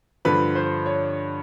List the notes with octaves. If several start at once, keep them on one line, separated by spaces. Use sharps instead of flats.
G2 D3 F3 B4
C5
C#5